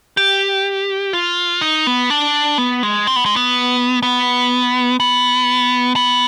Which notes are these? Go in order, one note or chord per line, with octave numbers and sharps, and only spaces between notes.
G4
F4
D#4
B3
D4
B3
G#3
C4
B3
G#3
B3
B3
B3
B3